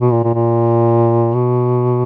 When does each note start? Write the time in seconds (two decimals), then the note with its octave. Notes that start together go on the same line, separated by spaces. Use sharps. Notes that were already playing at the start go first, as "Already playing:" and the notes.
0.01 B2
0.12 A#2
0.23 A#2
0.35 A#2
1.34 B2